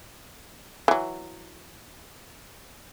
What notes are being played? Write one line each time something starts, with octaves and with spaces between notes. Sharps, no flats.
E3 F#3